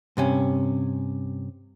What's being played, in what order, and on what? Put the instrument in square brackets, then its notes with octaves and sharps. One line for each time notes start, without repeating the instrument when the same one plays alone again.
[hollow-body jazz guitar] G2 C3 C#4